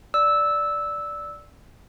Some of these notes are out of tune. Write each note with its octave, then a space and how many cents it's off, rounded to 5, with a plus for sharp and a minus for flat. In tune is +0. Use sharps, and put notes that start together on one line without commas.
D5 +0 E6 -10